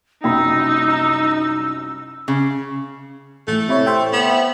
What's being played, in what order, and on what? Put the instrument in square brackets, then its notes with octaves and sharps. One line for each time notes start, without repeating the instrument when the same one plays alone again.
[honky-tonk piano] C2 F#2 B5 [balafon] A#3 [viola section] D#4 [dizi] E6
[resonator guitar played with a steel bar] C#3
[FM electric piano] A1 A2 [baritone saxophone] A3
[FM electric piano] C3 E4 C#5
C5 E5 G5
[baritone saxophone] B3